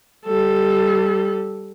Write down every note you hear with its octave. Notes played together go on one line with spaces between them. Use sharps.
G3 A4